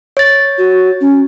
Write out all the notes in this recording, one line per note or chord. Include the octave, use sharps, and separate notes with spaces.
C#5 A6
F#4
C#4